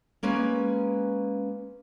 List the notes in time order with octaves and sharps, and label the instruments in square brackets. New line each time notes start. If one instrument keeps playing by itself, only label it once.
[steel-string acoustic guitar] G#3 A#3 C#4 B4